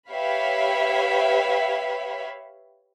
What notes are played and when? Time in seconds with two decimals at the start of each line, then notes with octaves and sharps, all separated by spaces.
0.10 G4 B4 C#5 E5 F5 B5